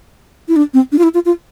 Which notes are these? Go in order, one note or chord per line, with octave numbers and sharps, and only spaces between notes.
E4
D4
C4
D4
F4
E4
F4
F4